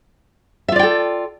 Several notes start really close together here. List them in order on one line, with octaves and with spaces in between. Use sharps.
E5 F4 D5 G5 A4